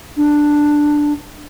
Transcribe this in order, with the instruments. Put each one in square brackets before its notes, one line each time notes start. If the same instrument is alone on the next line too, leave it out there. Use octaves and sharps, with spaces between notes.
[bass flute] D4